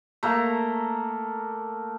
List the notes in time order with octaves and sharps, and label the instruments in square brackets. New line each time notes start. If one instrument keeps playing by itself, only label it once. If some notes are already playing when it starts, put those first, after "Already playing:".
[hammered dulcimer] A3 A#3 A#5